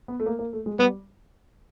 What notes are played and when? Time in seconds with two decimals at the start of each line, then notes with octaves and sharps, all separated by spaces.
0.08 B3
0.20 A3
0.26 A#3
0.39 A#3
0.53 A3
0.66 G#3
0.79 G3 B3